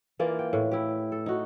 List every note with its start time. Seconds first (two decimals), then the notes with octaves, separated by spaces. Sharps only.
0.19 E3 A#3 F4 D5
0.39 G5
0.53 A2
0.71 E4 G4
1.12 A4
1.26 D#4 F#4